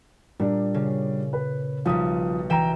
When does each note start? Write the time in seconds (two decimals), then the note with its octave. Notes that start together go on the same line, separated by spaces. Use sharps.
0.39 A#2 G3 D4
0.74 C#3
1.33 B4
1.85 B1 F3 G3 D#6
2.50 E3 G3 G5 A#5 E7